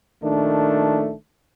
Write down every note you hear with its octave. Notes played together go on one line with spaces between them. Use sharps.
A#1 D#3 A3 D4